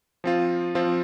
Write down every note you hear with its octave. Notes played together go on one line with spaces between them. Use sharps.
F3 C4 F4
F3 C4 F4